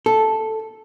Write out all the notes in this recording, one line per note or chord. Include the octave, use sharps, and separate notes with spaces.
A4